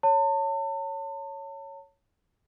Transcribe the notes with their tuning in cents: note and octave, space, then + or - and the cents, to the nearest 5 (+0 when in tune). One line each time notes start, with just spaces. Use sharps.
C#5 +0 A5 +35